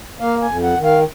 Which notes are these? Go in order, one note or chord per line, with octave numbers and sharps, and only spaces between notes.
A#3 F5
G#5
F2
F#5
D#3
F5